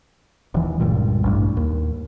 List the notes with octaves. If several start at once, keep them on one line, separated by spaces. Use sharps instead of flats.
D#1 E3
C#2 G2 A#2
A1 G2
D#2